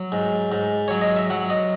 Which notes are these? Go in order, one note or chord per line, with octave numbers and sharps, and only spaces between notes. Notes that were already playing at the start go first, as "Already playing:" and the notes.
Already playing: F#3
G#2
G#2
F#3 C#5
D#5
E5
F#3 F#5
D#5